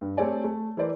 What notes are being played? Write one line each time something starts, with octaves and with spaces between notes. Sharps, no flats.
G2
A3 C4 G4 C#5 D5 G#5
A3
E3 E4 A#4 C5 D5